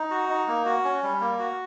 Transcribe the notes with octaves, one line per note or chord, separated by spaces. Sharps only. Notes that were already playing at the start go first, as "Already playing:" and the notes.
Already playing: D#4
F#4
D#4
A#3
F#4
C#4
G3
A#3
F#4